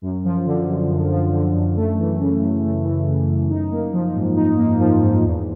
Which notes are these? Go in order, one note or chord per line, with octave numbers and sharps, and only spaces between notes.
F#2
F3
D3
F#2
F#2
F3
D3
F#2
A3
E3
C#3
F#2
A3
E3
C#3
F#2
D#4
A#3
F3
G#2
D#4
A#3
F3
G#2
E2